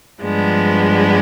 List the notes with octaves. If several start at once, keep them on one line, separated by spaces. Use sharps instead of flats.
G2 F3 G#3 B3 D4